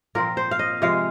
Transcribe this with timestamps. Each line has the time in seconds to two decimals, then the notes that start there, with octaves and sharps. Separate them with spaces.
0.15 A#2 F3 C4 A#4
0.37 C5
0.51 F5
0.59 D#5
0.82 C3 F3 G#3 F5